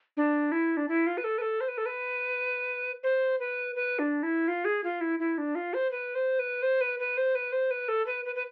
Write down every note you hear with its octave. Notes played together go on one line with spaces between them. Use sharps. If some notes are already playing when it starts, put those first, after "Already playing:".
D4
E4
D4
E4
F4
B4
A4
B4
A4
C5
B4
A4
B4
C5
B4
B4
D4
E4
F4
G#4
F4
E4
E4
D4
F4
C5
B4
C5
B4
C5
B4
B4
C5
B4
C5
B4
A4
B4
B4
B4